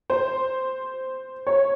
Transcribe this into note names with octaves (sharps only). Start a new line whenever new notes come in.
C5
C#5